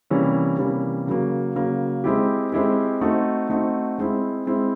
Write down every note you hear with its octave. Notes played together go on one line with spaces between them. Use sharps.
C3 E3 G3 A#3 C#4
C3 E3 G3 A#3 C#4
C#3 F#3 A#3
C#3 F#3 A#3
G#3 C4 E4 G4
G#3 C4 E4 G4
A3 C4 D#4 F#4
A3 C4 D#4 F#4
G#3 C4 E4
G#3 C4 E4